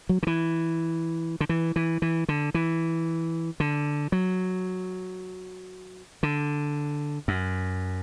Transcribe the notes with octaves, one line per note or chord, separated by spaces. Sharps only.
F#3
D3
E3
D3
E3
E3
E3
D3
E3
D3
F#3
D3
F#2